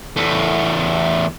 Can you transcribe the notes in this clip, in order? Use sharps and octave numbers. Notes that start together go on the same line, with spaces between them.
E2 A3